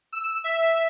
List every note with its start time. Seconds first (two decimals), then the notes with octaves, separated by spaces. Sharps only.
0.13 E6
0.44 E5